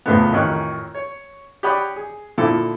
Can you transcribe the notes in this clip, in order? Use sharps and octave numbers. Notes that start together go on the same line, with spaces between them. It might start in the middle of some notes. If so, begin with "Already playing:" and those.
E2 A2 C#3 F3 G#3 B3
A1 F2 D#3 C#4 C#6 F#6
C#5
G4 C#5 D5 F#5 B5 D#6
G#4
A#2 D3 F3 E4 A4